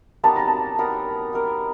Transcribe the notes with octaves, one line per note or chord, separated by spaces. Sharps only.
B3 D#4 G4 A#4 A5
A#5
A5
B3 D#4 G4 A#4
B3 D#4 G4 A#4